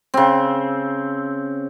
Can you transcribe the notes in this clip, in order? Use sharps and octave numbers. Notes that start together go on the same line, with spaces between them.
C#3 C4